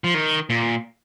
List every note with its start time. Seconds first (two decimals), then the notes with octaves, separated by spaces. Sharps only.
0.04 F3
0.14 D#3
0.50 A#2